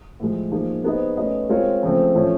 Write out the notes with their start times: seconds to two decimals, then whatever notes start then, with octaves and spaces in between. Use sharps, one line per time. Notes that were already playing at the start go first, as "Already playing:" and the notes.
0.20 A2 F3 G#3
0.52 F3 A#3 D#4 G#4
0.84 B3 D#4 G#4 C5 D#5
1.17 A3 C#4 F#4 B4 D#5
1.49 G#3 C4 F4 A#4 C#5
1.83 C#3 F3 A3 C4
2.14 A2 F3 A3 C#4